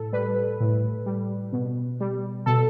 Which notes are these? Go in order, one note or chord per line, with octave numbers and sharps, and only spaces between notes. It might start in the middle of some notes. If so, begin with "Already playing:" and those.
Already playing: A2 A4
G3 B4
A2
G3
B2
G3
B2 A4